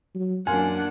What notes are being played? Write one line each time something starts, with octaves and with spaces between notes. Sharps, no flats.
F#3
F#2 A#3 D4 F#5 G#5 C6 F6